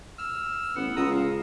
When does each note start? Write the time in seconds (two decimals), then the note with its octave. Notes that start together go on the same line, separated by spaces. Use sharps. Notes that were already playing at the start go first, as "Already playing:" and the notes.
0.18 E6 F6
0.76 A1 B3 F#5
0.96 C#2 A#5 D#6 E6
1.11 F5